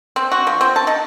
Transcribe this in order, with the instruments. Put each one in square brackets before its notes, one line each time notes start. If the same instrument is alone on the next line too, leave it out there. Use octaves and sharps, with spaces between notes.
[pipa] C4
F#4
F3
C4
A5
D#4